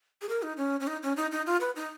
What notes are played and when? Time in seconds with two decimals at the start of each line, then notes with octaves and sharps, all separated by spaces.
0.22 G#4
0.29 A#4
0.43 D#4
0.58 C#4
0.80 C#4
0.87 D#4
1.03 C#4
1.17 D#4
1.32 D#4
1.47 F4
1.61 B4
1.76 D#4